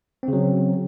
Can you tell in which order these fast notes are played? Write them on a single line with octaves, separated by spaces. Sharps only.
C4 C#3 F#3